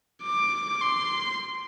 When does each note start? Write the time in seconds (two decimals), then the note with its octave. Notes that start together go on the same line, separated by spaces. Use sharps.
0.22 D6
0.81 C6